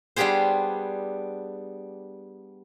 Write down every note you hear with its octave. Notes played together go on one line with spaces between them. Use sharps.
G3 B3 D4 G4 G#4 C5